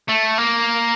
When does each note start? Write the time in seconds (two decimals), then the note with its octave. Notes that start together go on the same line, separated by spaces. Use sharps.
0.08 A3
0.38 A#3